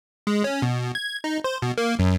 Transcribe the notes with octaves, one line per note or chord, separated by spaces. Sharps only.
G#3
C#4
B2
G#6
D#4
C5
B2
A#3
F#2